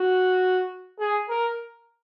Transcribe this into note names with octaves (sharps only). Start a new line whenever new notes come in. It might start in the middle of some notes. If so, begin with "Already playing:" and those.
Already playing: F#4
G#4
A#4